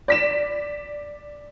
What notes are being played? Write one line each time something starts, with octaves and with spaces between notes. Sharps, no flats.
D5 B6 E7